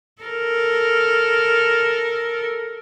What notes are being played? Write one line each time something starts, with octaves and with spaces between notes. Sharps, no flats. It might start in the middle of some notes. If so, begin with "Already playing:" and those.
A4 A#4